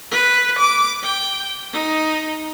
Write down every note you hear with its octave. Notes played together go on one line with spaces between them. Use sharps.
B4
D6
G5
D#4